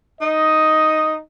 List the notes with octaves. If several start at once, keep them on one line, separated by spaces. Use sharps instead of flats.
D#4 D#5